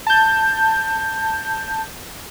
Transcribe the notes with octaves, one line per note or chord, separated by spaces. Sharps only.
A5 G6